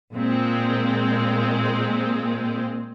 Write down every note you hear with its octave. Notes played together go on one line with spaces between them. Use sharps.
A#2 G#3 C4